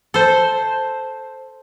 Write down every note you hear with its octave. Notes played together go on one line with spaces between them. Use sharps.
A4 C5